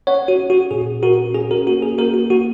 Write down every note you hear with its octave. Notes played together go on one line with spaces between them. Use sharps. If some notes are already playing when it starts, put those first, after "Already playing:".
C#4 C#5 F#5
F#4
C#4
F#4
A#2 G#4
C#4 F#4 A#4
C#4 G#4
F#4 A#4
A#3 F#4 A#4
G#4
A#3 F#4 A#4
F#4
A#3 F#4